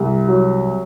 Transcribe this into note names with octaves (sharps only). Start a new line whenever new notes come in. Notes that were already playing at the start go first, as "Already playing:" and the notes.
Already playing: C2
F#3